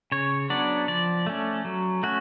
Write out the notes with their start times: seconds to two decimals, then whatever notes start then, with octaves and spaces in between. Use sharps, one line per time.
0.12 C#3 C#5
0.50 F#3 B3 D4 D5
0.88 F3 D5
1.26 A3 C#4
1.65 F#3
2.03 A3 C#4 F#4